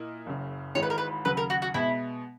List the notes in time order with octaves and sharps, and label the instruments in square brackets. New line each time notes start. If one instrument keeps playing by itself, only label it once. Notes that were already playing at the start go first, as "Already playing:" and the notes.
Already playing: [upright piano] A#2 A#3 E4 A#4 D#5
F#1 F#2 C#3
[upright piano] G#1 G#2 E3 G#3 [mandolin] C#5
[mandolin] B4
A#4
B4
[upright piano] D#2 C#3 F#3 [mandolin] B4
[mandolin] A#4
F#4
F#4
[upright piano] B2 G#3 B3 [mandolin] E4